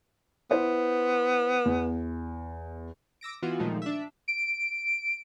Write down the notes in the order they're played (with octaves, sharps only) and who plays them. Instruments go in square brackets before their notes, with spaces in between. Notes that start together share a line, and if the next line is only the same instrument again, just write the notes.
[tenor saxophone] B3 [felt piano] E4 C5
[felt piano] E2
[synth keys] D6 E6 A#6 D7
E3 B3 F4 F#4
A#2 D#3 F3 G#3 A3 D#4
D4 E5
[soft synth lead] D7